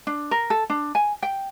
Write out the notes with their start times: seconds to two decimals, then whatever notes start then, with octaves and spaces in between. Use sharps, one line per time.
0.07 D4
0.31 A#4
0.50 A4
0.70 D4
0.95 G#5
1.23 G5